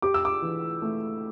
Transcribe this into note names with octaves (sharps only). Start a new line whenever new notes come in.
G4 D6
E6
D6
E3
A3